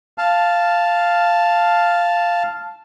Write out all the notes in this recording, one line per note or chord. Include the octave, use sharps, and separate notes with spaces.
F5 A5